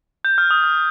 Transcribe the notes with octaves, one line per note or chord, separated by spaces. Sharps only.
G6
F6
D#6
F6